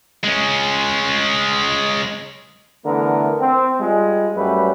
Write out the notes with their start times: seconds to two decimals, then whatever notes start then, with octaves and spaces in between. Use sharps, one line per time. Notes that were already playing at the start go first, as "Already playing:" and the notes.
0.24 G#3 C#4
2.85 D3 E3 A3 B3 A#4
3.40 C4
3.80 G3 G#3 F4
4.36 F#2 F#3 G3 A3 C#4 B4